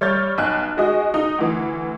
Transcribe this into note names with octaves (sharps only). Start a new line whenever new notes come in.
G3 C#5 F6 G6 A6
B1 G#5 F#6
G#3 F#4 G#4 D#5
D#4
D2 E3